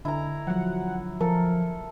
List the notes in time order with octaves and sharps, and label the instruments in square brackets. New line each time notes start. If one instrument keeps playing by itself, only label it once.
[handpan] D3 [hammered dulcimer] E4 A#5
[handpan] F3 F#3 [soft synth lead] F#5
[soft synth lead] F3 [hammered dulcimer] A4 [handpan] A#4